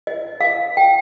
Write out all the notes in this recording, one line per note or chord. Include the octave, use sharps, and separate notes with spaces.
D#5
F5
G5